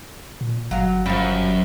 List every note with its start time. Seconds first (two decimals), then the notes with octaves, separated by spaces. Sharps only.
0.41 A#2
0.71 G1 F#3 F5
1.06 F#2 F3 G3